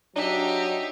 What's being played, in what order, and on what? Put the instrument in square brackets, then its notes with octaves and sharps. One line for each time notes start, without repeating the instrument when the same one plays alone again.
[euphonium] F#3 [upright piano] D4 [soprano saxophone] D#4 [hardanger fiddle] G4 E5